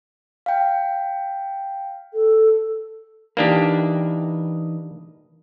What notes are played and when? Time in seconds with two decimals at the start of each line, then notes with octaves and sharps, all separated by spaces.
0.46 F5 G5
2.14 A4
3.37 E3 A#3 D4 D#4 G4 B4